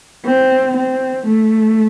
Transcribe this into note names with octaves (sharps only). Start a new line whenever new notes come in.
C4
C4
A3